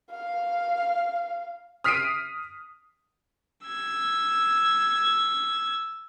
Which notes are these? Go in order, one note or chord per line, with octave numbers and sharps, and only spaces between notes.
F5
D#6 F6 B6 C7 D7 D#7
E6 G#6